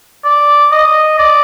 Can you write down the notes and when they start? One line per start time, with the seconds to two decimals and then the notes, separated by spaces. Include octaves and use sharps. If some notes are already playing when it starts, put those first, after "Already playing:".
0.24 D5
0.71 D#5
1.18 D5